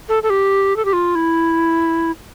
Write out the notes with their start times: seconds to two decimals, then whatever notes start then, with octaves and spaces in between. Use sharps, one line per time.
0.09 A4
0.23 A4
0.30 G4
0.76 A4
0.85 G4
0.93 F4
1.15 E4